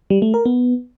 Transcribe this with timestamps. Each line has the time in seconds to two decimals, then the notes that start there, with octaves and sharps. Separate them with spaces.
0.10 G3
0.22 A3
0.34 A#4
0.46 B3